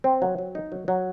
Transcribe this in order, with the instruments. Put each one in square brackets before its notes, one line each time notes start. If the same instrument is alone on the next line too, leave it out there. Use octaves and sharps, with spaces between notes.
[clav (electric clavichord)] C4
F#3
F#3
D#4
F#3
F#3